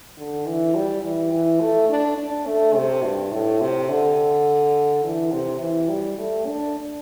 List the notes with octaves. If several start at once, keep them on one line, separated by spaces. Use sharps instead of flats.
D3
E3
G3
E3
E3
A3
D4
D4
A3
C3
G2
A2
C3
D3
E3
C3
E3
G3
A3
D4